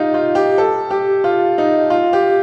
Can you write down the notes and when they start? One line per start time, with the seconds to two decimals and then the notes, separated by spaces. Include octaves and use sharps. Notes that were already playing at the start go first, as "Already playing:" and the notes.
Already playing: D#4 F4 G4
0.14 F4
0.35 G4
0.58 A4
0.91 G4
1.24 F4
1.58 D#4
1.90 F4
2.13 G4